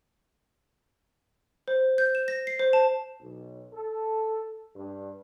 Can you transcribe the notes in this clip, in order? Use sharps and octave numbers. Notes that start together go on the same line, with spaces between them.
C5
G6
E7
A#6
C7
C5
A5
B1
A4
G2